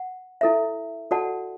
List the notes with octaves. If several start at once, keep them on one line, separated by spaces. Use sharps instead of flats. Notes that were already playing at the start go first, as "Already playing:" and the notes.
Already playing: F#5
E4 A4 E5
F#4 A4 D5 F#5 A5